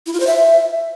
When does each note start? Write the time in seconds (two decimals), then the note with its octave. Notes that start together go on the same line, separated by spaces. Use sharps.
0.06 E4
0.13 F4
0.20 C5
0.27 E5